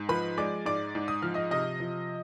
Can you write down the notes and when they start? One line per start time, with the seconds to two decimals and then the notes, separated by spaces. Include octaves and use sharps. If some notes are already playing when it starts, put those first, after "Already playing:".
Already playing: G#2
0.09 F3 B4 B5
0.38 G#3 D5 D6
0.65 G#2 D5 D6
0.95 G#2
1.08 D#6
1.22 F3 F6
1.34 D#5 D#6
1.51 C3 D#5 D#6
1.80 F3